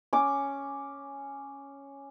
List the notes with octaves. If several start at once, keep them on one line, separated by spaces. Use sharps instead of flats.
C#4 D6